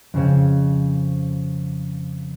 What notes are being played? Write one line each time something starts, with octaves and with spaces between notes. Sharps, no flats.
F2 C#3 C4